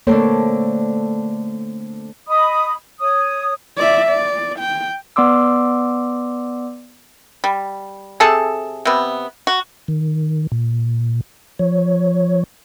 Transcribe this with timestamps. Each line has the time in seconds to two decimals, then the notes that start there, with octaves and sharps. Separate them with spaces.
0.07 D3 A3 A#3 C4 A4 C#5
2.28 D#5 B5 D#6
3.00 C#5 D#6
3.77 D5 E5
4.08 D5
4.59 G5
5.16 B3 D5 C6 D6 E6
7.44 G3
8.20 C3 G#4 A4 A5
8.85 C3 B3
9.47 F#4
9.88 D#3
10.52 A#2
11.59 F3 C#5